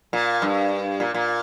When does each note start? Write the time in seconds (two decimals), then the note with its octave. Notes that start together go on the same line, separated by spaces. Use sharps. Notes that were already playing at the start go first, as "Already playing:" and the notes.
0.13 A#2
0.42 G2
1.00 A#2
1.14 A#2